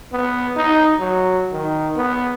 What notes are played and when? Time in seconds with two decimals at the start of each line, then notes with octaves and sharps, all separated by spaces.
0.13 B3
0.57 D#4
0.99 F#3
1.53 D#3
1.96 B3